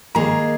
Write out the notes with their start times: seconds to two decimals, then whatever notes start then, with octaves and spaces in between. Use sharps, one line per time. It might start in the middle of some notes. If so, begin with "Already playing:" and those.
0.15 D#3 A#3 G#4 D#5 A#5